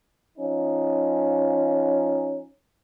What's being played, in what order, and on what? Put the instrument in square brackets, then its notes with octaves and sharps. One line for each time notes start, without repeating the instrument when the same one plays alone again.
[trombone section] F3 C#4 D#4